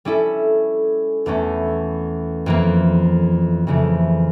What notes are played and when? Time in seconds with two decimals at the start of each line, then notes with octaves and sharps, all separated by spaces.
0.05 G3 C#4 E4 A4
1.26 E2 E3 A3 C#4
2.46 F2 E3 A#3
3.67 F2 C#3 E3 A3